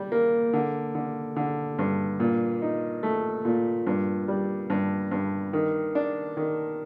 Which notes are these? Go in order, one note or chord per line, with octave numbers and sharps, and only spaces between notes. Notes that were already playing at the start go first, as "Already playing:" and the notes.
Already playing: G3
A#3
D3
D3
D3
G2
A#2
D#4
A3
A#2
G2
G3
G2
G2
D#3
D4
D#3